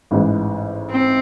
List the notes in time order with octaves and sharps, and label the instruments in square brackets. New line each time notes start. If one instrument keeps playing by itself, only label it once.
[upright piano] A1 G#2 E3 G#3
[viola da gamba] C4